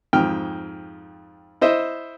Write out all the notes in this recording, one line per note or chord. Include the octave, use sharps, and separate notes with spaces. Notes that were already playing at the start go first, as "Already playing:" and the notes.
F2 G#2 G5 F6
E4 C5 D#5 E5